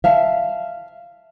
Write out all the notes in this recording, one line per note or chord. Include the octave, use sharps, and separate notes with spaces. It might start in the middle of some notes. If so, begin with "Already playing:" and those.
E5 F5 A5